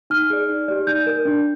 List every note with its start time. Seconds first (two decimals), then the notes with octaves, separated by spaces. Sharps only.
0.10 D#4 F6
0.30 G#4 D5
0.49 D#4
0.68 G4 D5
0.87 D#4 G6
1.07 A#4 D5
1.25 D4